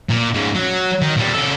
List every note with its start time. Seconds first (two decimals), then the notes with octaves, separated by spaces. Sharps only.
0.09 A#2
0.34 G#2 C#3
0.55 F#3
1.02 D#3
1.17 A#2 G3
1.34 C#3 A4